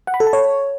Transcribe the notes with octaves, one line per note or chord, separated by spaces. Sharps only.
F#5
B5
A4
A5
C#5